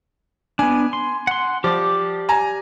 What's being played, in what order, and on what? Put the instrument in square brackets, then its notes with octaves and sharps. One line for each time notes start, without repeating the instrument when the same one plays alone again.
[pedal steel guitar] B3 D4 [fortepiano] G#5
[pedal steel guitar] C6
F#5 C6
[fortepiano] F3 [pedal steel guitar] G4 D5 D6
[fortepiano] G#5 A#5